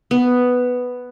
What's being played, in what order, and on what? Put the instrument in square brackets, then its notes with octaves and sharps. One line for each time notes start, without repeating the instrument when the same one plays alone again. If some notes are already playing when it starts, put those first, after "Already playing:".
[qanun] B3